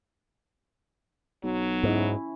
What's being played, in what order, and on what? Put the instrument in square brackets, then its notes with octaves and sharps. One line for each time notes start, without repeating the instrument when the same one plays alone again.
[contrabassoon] B1 [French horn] F#3
[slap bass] G#2 [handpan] C#4 E4